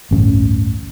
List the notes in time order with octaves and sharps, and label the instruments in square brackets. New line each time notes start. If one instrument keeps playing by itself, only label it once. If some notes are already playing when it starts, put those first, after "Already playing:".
[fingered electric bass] A1 D2 G2 C#4